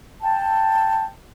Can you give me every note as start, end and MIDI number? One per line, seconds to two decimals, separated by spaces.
0.23 1.06 79
0.23 1.06 81